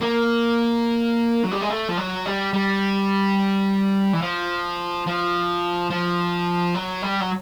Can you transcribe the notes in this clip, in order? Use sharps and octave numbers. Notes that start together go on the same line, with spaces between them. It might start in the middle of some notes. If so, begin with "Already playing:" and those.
A#3
F#3
G3
G#3
A3
F3
F#3
G3
G3
E3
F3
F3
F3
F#3
G3
F#3